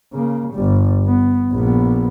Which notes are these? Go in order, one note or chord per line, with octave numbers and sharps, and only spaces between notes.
C#3 A#3
G1 G3
B3
A#1 B3